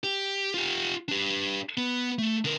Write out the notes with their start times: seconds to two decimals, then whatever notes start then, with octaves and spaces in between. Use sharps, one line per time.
0.04 G4
0.54 F4 G4
1.09 D4 G4
1.77 B3
2.18 A3
2.44 D3 A#4